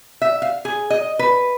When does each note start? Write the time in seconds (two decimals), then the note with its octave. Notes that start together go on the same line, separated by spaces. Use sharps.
0.22 E5
0.42 F5
0.65 G#4
0.90 D#5
1.19 B4